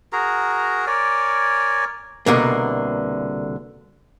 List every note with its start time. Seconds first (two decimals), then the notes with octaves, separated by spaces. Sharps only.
0.13 F#4 G#4 A#4 A#5
0.87 A#4 C#5 D5 G#5
2.26 C2 B2 D3 A#3